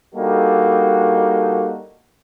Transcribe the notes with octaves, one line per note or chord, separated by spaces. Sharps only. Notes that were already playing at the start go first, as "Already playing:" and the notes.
G3 A#3 D4 D#4 F#4 A4